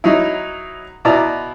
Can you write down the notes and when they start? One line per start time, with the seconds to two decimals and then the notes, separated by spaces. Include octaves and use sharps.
0.04 F#3 D#4 E4
1.05 B2 E4 D5 A#5